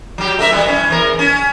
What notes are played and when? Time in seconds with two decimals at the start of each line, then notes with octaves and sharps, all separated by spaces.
0.18 F#3 G4
0.39 A3 A#4 E5
0.51 E3 G3
0.66 E3 C#4
0.90 E2 A#4
1.19 C#4